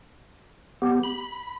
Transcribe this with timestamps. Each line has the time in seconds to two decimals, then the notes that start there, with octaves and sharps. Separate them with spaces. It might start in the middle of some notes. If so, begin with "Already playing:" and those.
0.82 B3 G4
1.03 B5